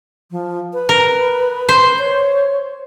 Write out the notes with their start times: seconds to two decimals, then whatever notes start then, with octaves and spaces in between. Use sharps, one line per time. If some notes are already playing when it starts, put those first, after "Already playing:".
0.31 F3
0.73 B4
0.89 A#4
1.69 C5
1.99 C#5